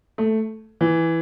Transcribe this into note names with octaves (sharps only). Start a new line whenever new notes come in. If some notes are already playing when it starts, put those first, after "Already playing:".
A3
E3